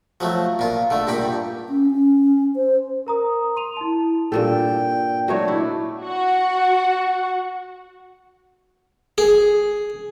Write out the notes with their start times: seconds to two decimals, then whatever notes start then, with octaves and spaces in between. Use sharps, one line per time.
0.20 F3 F#3 A3
0.59 A#2 F4
0.90 D3 A3
1.07 G2 A#2 G4 B5
1.69 C#4
1.91 C#4
2.56 C5
3.06 A#4 A#5 D#6
3.56 C6 D#7 F7
3.77 E4 A5
4.32 G2 A#2 A4 G5
5.28 F#3 A3 D4 D#4 C#5
5.48 E4
6.01 F#4 F#5
9.18 G#4